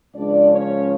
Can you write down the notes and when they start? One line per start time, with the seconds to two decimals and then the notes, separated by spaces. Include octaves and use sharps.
0.15 C#2 C#3 F3 D4 D5
0.52 C#4 C#5